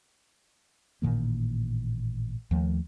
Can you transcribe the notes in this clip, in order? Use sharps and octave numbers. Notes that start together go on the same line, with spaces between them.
A1 A#2 D#3 A#3
D#2 F3 A3